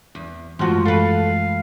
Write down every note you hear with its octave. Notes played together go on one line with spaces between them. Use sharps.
E2
F#2 E3 F3 G#3 A3 F4 F#4 C6
A4 B4 F5